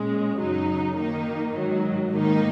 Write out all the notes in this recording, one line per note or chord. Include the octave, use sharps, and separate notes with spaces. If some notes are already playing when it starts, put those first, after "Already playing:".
Already playing: A#2 G#3 C#4
F#2 C#3 F#3 D#4
D#3 A#3 D#4
G#2 D#3 F#3
G#2 D#3 A#3 D#4